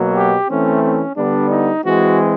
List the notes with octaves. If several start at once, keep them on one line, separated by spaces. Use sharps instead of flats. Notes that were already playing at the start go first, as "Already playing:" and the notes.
Already playing: B2 F#3 A#3
G4
E3 A3 C4 C#4
C#4
D3 G3 B3 D4
D#4
E3 G#3 C4 F#4